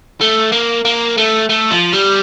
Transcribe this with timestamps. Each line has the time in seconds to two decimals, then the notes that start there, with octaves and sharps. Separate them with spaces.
0.21 A3
0.52 A#3
0.85 A#3
1.17 A3
1.49 A3
1.71 F3
1.93 G3